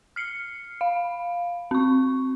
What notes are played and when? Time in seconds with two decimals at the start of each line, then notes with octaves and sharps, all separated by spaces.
0.16 F6 C7 C#7
0.81 F5
1.71 C4 C#6